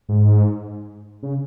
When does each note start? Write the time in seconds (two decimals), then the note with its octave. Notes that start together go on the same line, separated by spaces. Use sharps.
0.09 G#2
1.23 C#3